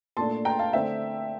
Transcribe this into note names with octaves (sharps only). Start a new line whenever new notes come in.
A#2 A3 D4 A5 C6
G5 A#5
F5 A5
D3 A3 C4 E5 G5